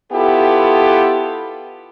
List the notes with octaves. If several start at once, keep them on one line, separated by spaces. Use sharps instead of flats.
B3 E4 F4 G4 A4